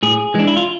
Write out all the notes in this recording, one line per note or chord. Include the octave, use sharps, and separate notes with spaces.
A2 G#4
E3 G#3 D4
E4
F4